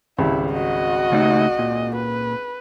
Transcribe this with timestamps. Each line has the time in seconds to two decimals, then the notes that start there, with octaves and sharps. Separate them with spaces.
0.19 G#1 C#2 G3 E4
0.52 F#4 D#5
1.12 C#3 A3 D#4
1.59 A#2
1.95 B4